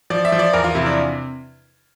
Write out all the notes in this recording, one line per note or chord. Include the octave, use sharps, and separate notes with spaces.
F3 D5
E5
F3
D5
E2 A#4
F4
C3 E4
D4